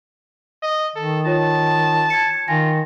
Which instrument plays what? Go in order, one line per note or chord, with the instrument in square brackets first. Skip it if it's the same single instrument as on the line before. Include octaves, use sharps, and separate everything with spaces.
[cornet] D#5
[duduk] D#3 [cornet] A4
[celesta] F4 C#5 [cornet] A5
[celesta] G#6 C#7
[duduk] D#3 [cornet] F4 [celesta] G#5 A#6